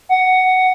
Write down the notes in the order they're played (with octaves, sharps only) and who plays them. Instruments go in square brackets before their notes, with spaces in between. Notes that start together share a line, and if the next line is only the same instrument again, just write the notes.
[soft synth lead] F#5